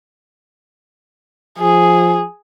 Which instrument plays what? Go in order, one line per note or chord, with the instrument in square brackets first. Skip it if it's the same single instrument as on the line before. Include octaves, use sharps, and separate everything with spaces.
[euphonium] F3 [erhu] G#4